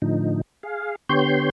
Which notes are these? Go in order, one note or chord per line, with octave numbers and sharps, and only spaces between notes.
A2 D3 F3 D#4
G#4 F5
D3 B3 G4 C#5 C6 G6